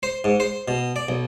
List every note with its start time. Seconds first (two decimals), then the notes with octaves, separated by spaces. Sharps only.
0.03 C5
0.24 G#2
0.40 C5
0.68 B2
0.96 D5
1.09 B1